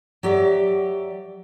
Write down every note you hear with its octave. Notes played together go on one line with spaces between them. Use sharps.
F#3 G4 D5 E5